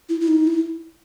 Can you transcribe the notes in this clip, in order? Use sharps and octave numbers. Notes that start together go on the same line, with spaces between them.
E4
E4
D#4
E4